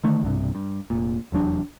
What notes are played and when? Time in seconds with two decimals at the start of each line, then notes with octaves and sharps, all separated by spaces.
0.04 D3 D#3 A3
0.23 B1 G2 C3
0.55 G2
0.90 F1 A#2
1.32 F1 E2 F#3 D4